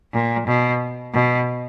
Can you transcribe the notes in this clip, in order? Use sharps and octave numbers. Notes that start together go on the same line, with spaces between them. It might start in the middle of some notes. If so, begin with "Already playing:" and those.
A#2
B2
B2